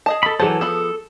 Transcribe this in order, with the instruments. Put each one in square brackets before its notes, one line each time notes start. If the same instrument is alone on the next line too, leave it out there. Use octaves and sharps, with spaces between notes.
[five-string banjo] G#4 D#5 A5
[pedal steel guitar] A4 B5
[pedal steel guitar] E3 F#3 A4 [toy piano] G#4 A5 [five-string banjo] C5
[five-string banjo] F3 B3 B5 [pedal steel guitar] A4